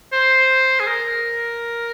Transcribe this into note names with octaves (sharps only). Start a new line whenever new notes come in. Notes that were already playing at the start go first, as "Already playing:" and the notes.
C5
G#4
A#4